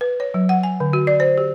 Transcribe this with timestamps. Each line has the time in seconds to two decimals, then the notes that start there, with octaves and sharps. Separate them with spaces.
0.01 B4
0.20 C#5
0.34 F#3
0.49 F#5
0.63 G#5
0.80 D3
0.93 F#4
1.07 D5
1.20 C5
1.38 G4